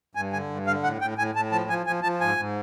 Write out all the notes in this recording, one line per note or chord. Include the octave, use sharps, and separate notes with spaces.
G2 G#5
D3 G#5
G2
D3 F5
A2 F#5
A2 G5
A2 G#5
A2 A5
F3 A5
F3 G#5
F3 G#5
F3 A5
G#2 G#5
G#2